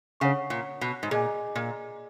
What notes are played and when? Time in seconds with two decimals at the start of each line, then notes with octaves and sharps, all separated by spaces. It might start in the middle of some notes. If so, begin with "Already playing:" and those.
0.20 C#3 C#5 F#5 C#6
0.50 A#2
0.81 B2
1.03 G#2
1.11 A#2 G#4 D#5 G#5
1.56 A#2